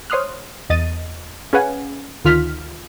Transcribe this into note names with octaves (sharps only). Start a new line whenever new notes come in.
C5 C#5 C6 D#6 F6 F#6
E2 D#5 A6 D#7
C#4 G#4 B4 F5 F#5 G#5
D2 D#3 F4 F6 B6